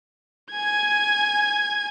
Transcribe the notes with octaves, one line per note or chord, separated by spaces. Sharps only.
G#5 G#6